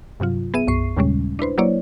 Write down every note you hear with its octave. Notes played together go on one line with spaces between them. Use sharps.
G2 C3 F#3 F4
B3 G#4 E5 D#7
B1 F#2 C#6 C7
D#2 A#2 C#3 G3 G#3 C#4
D4 E4 B4 C5
F#3 A#3 E4 C#5 D5